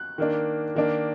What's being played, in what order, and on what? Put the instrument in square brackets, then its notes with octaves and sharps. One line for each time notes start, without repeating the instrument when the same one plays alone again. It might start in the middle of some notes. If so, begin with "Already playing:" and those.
Already playing: [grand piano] F#6
D#3 A#3 D4
D#3 A#3 D4